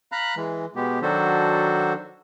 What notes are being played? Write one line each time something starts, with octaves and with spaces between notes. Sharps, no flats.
F5 A#5 B5 F#6
E3 G#3
B2 G#3 B3 G4
D#3 F#3 D4 F#4 A4 C5